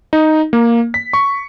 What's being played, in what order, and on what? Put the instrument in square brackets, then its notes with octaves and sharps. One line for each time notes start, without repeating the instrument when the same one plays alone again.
[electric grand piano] D#4
A#3
B6
C#6